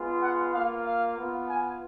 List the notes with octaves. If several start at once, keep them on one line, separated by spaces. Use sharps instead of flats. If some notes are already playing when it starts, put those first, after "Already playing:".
Already playing: G#3 B3 F4
F#5
A#3 F4 F5
F5
B3
F4
G#5